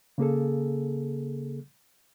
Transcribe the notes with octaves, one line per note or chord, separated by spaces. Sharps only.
C#3 A#3 G#4 A4